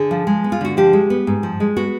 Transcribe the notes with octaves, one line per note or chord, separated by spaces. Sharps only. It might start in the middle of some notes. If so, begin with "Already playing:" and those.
Already playing: D3 G#4
F3
G#3
B3
F4
D3 F#4
F3 G4
G#3
B3
G#2
F3
G#3
B3 F#4